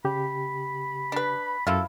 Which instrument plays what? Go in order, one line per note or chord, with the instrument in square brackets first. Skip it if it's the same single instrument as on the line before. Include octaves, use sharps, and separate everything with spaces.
[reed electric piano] C#3 G4 [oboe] B5
[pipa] D4 B4
[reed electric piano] F#2 [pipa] F3 E4 F4 [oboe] A4